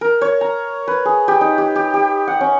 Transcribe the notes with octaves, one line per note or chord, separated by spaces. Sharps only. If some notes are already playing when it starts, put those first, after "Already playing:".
A#4
C#5
A#5
B4
G#4
G4
D#4
G4
G4
G4
F#5
C#4